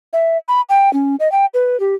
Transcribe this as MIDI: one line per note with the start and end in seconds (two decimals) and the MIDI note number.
0.13 0.37 76
0.48 0.61 83
0.69 0.92 79
0.93 1.16 61
1.20 1.31 75
1.32 1.46 79
1.54 1.79 71
1.80 1.95 67